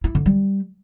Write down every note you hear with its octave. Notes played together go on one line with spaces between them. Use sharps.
E4
D3
G3